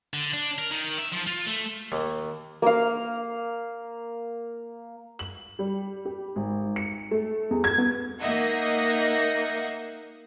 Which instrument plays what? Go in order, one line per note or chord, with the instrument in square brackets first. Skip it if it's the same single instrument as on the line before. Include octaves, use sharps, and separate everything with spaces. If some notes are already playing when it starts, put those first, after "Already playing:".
[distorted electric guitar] D3
D4
A#4
D#3
E5
F3
F4
A3
[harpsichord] D#2
[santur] A#3 F5
[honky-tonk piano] F#7
G3
G4
G#1
C#7
A3
E2
G#6
B3
[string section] A#3 D#4 D#5 E5 F#5